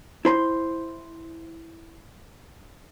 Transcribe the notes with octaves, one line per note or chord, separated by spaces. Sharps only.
E4 C5 B5 C6